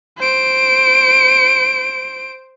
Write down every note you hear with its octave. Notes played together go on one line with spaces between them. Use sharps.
C5 D7